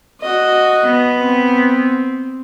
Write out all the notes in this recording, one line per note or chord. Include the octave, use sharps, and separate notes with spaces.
F#4 D#5
B3
C4